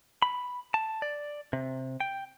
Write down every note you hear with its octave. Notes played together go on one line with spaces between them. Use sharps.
B5
A5
D5
C3
G5